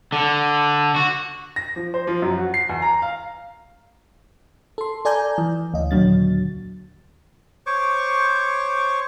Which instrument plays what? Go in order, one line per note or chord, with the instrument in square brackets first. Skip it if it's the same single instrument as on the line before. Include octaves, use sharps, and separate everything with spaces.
[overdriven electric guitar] D3
F#4
[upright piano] A#6
F3
C5
F3
F#2
F#4
C7
E2
A#5
F5
[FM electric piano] A4 C6
A4 D5 G#5 A#5 G6
E3
D2 D#5
D#2 A#2 D3 F#3 A6
[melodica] C5 C#5 C#6 D6